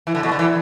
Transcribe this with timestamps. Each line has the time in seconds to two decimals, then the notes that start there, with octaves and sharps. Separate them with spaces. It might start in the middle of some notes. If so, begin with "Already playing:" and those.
0.07 E3
0.15 D3
0.23 B2
0.31 D3
0.39 E3